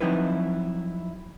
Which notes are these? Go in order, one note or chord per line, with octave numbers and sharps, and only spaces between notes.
F3 F#3 C4 D#4 E4 B4